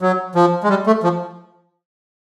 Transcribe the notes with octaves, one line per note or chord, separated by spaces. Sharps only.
F#3
F3
G#3
G3
A3
F3